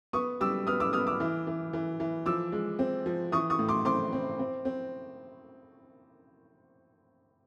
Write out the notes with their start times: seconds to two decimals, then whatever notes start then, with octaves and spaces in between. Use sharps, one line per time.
0.13 B3 C#6 D#6
0.41 G3 D6 E6
0.67 B3 D#6 F6
0.80 D6 E6
0.93 B3 D#6 F6
1.07 D6 E6
1.20 E3
1.47 E3
1.73 E3
2.00 E3
2.26 F3 D6 E6
2.52 G#3
2.79 C4
3.06 F3
3.32 E3 C#6 D#6
3.50 C#6 D#6
3.59 A2
3.69 C6 D6
3.85 C4 C6 D6
4.13 C4
4.39 C4
4.65 C4